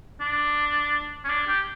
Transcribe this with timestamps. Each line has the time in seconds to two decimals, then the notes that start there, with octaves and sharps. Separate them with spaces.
0.20 D4
1.24 C#4
1.29 D4
1.47 G4